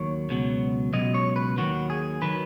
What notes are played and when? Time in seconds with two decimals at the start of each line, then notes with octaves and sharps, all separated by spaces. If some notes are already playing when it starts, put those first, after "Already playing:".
Already playing: D#2 D#3 F#3 C#5
0.29 C#2 B2 F#3
0.93 C#2 B2 F#3 D#5
1.14 C#5
1.36 B4
1.58 D#2 D#3 F#3 F#4
1.90 G#4
2.22 D#3 F#3 B4